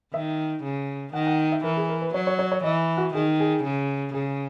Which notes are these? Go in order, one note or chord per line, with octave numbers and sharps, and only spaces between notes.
D#3 E5
C#3
D#3 F#5
F#5
E5
E3 A#4
G#4
A#4
B4
F#3 C#5
C#5
C#5
C#5
E3 D#5
F#4
D#3 G#4
G#4
C#3
C#3 G#4